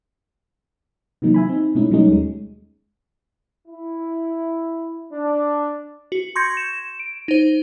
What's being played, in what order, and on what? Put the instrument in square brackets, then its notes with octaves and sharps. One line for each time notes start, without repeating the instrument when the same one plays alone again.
[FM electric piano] C3 D#3 E3 F#3 A#3 D#4
E5 G#5 B5
C4 D#4
B2 G#3 A3 C#4 D#4 E4
B2 F#3 G3 A3 C#4 D#4
D#2 G#3
[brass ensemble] E4
D4
[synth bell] F#4
C6 C#6 G6 G#6 A#6 C#7
E7
D7
D#4 C5